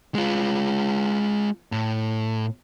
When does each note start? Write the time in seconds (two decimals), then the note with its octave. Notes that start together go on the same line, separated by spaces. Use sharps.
0.15 G#3 F4
1.72 A2